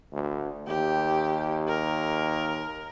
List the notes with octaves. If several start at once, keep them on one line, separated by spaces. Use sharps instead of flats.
D2
D#2 G4
A#4